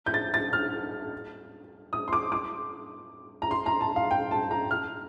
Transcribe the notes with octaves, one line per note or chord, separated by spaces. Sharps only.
G6
A6
A6
F6
D#6
C6
D6
D6
A#5
C6
A#5
A5
F5
G5
A5
A#5
F6